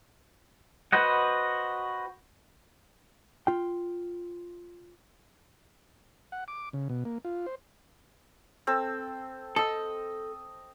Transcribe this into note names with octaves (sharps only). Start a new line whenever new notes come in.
F#4 B4 C5 D#5 F#5
F4 G5
F#5
D6
C#3
B2
A#3
F4
C5
C4 A4 E6
A4 D#5 E6